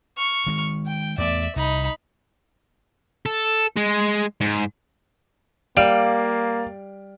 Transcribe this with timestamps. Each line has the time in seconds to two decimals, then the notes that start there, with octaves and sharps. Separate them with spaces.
0.17 C#6 F6
0.47 D#3 G#3
0.86 G5
1.18 E2 A3 B3 D5 E5
1.56 C2 D#4 B5
3.26 A4
3.77 G#3
4.41 G#2
5.77 G3 A#3 D5 F5 D7